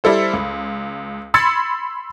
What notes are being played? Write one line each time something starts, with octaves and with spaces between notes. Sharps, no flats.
G3 E4 A4 C5
C#2
B5 C6 E6 G#6 A6 C#7